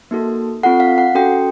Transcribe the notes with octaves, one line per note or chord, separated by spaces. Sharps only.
A#3 D#4 F#4 A4
C4 F4 A4 F#5
F5
F#5
C#4 F#4 A4 G5